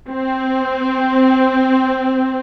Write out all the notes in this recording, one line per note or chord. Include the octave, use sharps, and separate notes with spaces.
C4